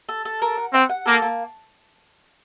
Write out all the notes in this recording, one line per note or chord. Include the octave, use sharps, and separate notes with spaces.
A4
A4
A#4
F#5
C4 F#5
F#5
A#3 A4
A#3